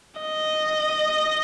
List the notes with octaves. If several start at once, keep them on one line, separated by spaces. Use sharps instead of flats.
D#5